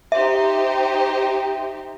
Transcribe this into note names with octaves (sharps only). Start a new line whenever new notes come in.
D#4 G4 C5 E5